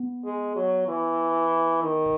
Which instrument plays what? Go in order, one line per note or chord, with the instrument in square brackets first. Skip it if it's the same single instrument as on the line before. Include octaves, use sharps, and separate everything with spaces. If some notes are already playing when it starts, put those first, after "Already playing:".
Already playing: [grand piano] B3
[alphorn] G#3
F#3
E3
D#3